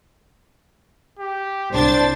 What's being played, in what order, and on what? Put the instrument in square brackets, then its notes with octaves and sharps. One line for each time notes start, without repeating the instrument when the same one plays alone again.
[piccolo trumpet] G4
[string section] C2 D4 A6 [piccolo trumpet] C5